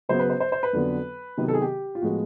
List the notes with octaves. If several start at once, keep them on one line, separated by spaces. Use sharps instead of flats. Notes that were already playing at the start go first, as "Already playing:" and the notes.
C#3 F#3 B3 C5
B4
C5
C5
C5
B4
F2 D3 F#3 B3
C3 D#3 F#3 B3
A4
G#4
G4
F4
A2 F3 G#3 B3 F#4